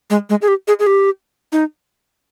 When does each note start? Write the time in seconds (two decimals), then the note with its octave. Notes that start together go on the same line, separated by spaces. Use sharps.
0.10 G#3
0.30 G#3
0.42 G#4
0.48 G4
0.68 G#4
0.79 G#4
0.87 G4
1.52 D#4